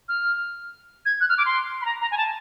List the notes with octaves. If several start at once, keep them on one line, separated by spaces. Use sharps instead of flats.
F6
G#6
F#6
F6
D6
C6
B5
A#5
A#5
G#5
A5